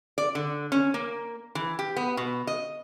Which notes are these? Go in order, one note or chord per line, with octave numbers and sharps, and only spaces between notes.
D5
D3
C#4
A#3
E3
G4
B3
B2
D#5